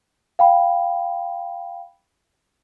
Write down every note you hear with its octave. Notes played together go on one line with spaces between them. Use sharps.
F5 G5 B5